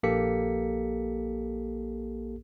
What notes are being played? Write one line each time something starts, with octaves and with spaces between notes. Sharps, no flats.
A#1 A#3 G4 A4 B6 C#7